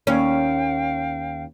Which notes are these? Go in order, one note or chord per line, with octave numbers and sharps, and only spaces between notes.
D#2 C#4 F5 G5